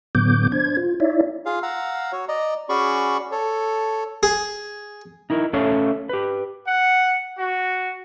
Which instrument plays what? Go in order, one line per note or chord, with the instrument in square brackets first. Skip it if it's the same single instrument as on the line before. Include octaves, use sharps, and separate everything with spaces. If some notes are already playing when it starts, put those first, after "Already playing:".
[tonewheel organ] A2 D3 F#3 B3 D6 G6
D4 C5 G#6
F4
D#4 E4 C#5 D5 E5
[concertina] F4 G#4 F5
F5 F#5 A#5 E6
F#4 C#5
D5 D#5 A#5
C#4 F#4 G#4 D5 B5 C#6
A4 C#5
[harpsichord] G#4
[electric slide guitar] D#4 E4 A#4
A3 C#4 A4 C#5 E5 F5
G4 B4
[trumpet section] F#5
F#4